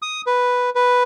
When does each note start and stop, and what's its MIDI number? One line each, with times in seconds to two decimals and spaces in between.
0.02 0.21 87
0.27 0.70 71
0.75 1.03 71